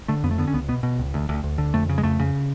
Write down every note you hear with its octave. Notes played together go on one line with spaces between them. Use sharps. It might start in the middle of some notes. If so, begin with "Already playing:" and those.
D3 A3
F2 B3
A3
D3 B3
C#4
C#2 B3
B2 B3
B2
C#2
D2
D2
D2
D3
F2 A3
C#3
G#3
F2 A3
C#3